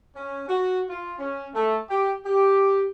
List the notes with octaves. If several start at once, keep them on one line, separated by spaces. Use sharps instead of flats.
C#4
F#4
F4
C#4
A3
G4
G4